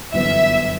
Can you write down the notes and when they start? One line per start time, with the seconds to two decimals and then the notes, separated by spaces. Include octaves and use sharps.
0.14 G1 F#2 E3 B3 E5